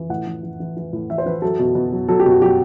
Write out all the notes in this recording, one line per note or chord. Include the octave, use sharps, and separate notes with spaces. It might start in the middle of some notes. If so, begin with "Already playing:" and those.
Already playing: E3
A2 F#5
E3
E3
E3
E3
A2
E3 E5
C5
E3 B4
F#3 A4
B2
B2
F#3
F#3 A4
G4
B2
F#4
F#3 G4